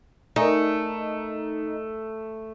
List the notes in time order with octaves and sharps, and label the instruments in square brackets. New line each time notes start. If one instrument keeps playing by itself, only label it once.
[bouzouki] A3 [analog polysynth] D#4 [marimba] A#4 D5 G#5